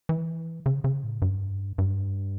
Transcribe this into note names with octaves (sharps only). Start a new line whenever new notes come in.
E3
C#3
C#3
A2
G2
G2